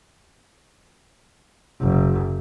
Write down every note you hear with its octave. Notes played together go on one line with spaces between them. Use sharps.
F#1